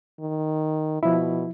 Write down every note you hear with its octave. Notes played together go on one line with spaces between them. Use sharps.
D#3
B2 F3 E4